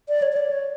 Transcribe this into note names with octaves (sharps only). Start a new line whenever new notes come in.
D5
C#5
C#5
D5
C#5